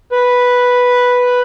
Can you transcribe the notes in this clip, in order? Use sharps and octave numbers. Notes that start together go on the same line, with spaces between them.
B4